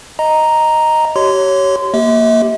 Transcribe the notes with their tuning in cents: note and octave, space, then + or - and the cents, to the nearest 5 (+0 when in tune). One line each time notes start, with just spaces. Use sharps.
D#5 +0 A#5 +0
G4 -35 C#5 +0 C6 -25
A#3 +0 G4 +0 E5 -45